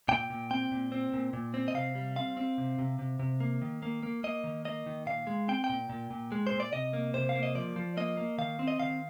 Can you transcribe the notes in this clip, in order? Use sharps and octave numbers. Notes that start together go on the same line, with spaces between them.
A#2 G5
A#2
C4 G5
A#2
C4
A#2
A#2
C4
D#5
C3 F5
G3
C4 F5
C4
C3
C3
C3
C3
A#3
D#3
A#3
A#3
A#3 D#5
D#3
A#3 D#5
D#3
A#2 F5
G#3
C4 G5
G5
A#2
A#2
A#2
G#3
A#2 C5
D5
C3 D#5
A#3
C3 C5
F5
A#3
D#5
F3 D5
F3
A#3 D#5
A#3
D#3 F5
C4
D#5
D#3 F5